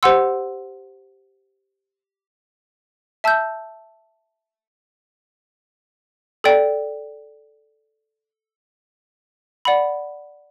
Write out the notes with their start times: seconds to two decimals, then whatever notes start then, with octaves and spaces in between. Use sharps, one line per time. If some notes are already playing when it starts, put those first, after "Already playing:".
0.03 G4 C5 F#5 C6 E6
3.24 E5 A5 E6 G6
6.44 A4 D5 G5
9.65 D5 F#5 B5